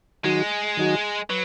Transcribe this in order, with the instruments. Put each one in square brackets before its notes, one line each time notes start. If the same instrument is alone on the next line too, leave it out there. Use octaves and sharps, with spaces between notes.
[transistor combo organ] D#3 F#3 D#4 F#4 [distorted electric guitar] G#3
[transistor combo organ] D#3 F#3 D#4 F#4
[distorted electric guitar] F#3 [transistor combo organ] B4